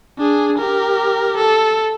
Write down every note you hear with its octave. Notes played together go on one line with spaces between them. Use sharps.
D4 G#4
G4 A#4
A4